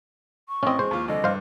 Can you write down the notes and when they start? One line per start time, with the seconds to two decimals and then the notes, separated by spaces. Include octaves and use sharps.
0.49 C#6
0.63 A1 C4 C#4 D#5
0.79 G#3 C4 C5
0.91 D#2 F4
1.08 C2 D3 D#5
1.24 G2 C5 F5